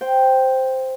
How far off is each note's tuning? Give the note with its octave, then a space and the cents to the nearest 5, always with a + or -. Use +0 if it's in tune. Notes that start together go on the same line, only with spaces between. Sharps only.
C5 +0 G5 +0